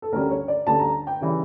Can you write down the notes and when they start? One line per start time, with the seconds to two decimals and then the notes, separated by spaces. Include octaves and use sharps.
0.02 A4
0.12 D2 D3 G3 C#4 A#4
0.31 C#5
0.48 D5
0.67 D2 D3 G3 C#4 A5
0.80 A#5
1.07 G5
1.20 C#3 E3 G3 C#4